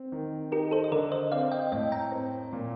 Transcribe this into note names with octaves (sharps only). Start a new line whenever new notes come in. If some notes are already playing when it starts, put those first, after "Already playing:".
Already playing: C4
D#3
D#4 G4 A#4
A4 C5
D#5
D3 A#4 D5
C5 D#5
C4 D5 F5
D#5 G5
A2 D#5 G5
G5 A#5
C4
A#2